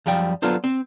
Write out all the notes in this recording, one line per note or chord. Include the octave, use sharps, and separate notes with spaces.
F#2 F3 G3 G5
F#3 B3 D4 F4 A4 C5
C4